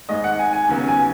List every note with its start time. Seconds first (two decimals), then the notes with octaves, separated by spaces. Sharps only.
0.09 G#1 G#2 G#3 D#5
0.24 F#5
0.39 G#5
0.53 G#5
0.68 D#2 C#3 F#3 B3
0.88 G#5